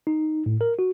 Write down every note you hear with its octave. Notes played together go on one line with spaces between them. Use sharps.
D#4
A2
A#4
F#4